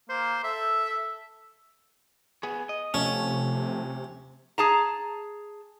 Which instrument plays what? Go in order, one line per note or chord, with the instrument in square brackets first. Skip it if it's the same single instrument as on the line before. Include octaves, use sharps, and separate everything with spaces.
[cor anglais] A#3 [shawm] C5
[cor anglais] A4 [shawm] E5
[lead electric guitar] B3 G#4
D#5
[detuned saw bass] C3 [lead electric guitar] F3 A3 [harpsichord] C#4
[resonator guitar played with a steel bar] G#4 A5 A#5